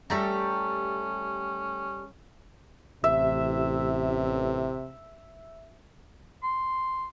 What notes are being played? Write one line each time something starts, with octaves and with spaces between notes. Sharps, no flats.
G3 A3 C#4 G4 A4 A#5
A1 C3 E5
C6